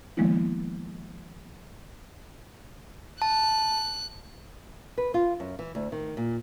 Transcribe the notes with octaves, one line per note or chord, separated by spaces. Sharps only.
D#3 F3 G#3 A#3 B3 E4
A5 F#6
B4
F4
F#2
E3
D2
D#3
A#2